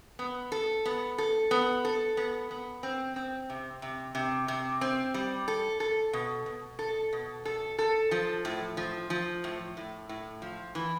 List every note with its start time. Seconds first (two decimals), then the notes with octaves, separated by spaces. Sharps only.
0.19 B3
0.52 A4
0.86 B3
1.18 A4
1.51 B3
1.85 A4
2.17 B3
2.51 B3
2.83 C4
3.16 C4
3.50 C3
3.82 C3
4.15 C3
4.48 C3
4.81 C4
5.14 G3
5.48 A4
5.80 A4
6.13 B2
6.46 B2
6.79 A4
7.13 B2
7.45 A4
7.79 A4
8.11 F3
8.45 A2
8.77 F3
9.10 F3
9.44 A2
9.77 A2
10.09 A2
10.42 F3
10.75 E3